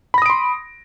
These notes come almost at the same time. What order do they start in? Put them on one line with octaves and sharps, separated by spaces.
B5 A#6 D#6 D7 C6